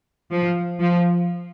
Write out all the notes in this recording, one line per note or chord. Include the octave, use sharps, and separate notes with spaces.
F3
F3